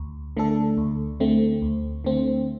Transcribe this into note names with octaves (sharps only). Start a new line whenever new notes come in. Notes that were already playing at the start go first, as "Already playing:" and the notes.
Already playing: D2
D3 A3 D4 A4
D2
D3 A3 C4
D2
D3 A3 C4